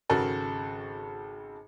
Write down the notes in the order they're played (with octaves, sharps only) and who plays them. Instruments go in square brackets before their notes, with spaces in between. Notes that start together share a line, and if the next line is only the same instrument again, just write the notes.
[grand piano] G#1 C#3 F#4 A4 A#4